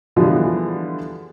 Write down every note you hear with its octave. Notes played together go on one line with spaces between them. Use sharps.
D3 E3 F3 G3 G#3 B3